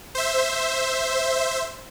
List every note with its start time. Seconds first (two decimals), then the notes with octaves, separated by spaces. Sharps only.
0.15 C5 E5